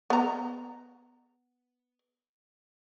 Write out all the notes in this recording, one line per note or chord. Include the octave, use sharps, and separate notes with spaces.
B3 A#5